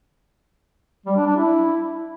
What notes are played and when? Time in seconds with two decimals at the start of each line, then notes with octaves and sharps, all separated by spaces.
1.06 G3
1.16 D4
1.26 D4
1.37 E4